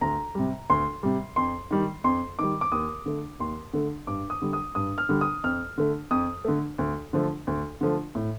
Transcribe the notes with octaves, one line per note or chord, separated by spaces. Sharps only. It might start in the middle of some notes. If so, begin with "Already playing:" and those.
D2 A#5
C3 G3
D2 C6
C3 G3
F2 C6
D#3 G3
F2 C6
D#3 G3 D6
D6
D#2 D#6
D3 A3
D#2 C6
D3 A3
G2 D6
D#6
D3 G3
D#6
G2 D#6
F6
D3 G3
D#6
F2 F6
D3 A3
F2 D#6
D3 A3
D2
D3 F3 A3
D2
D3 F3 A3
A2